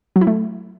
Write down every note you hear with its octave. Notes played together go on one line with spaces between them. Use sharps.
F#3
E4
A3